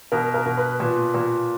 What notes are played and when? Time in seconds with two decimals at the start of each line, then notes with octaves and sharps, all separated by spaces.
0.12 B2 A#4
0.34 A#4
0.45 B2
0.57 B4
0.80 A#2
1.14 A#2